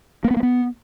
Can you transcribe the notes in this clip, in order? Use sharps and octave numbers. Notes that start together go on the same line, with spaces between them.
A#3
B3
A#3
B3